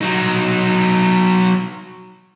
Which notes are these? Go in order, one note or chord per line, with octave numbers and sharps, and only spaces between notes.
F#3 D#4